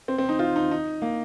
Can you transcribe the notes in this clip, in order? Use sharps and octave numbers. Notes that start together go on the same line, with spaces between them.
C4
C4
D#4
F4
D#4
D#4
A#3